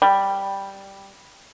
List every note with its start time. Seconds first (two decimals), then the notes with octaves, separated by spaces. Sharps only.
0.02 G3